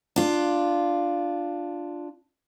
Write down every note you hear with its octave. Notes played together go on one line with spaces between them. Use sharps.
D4 F4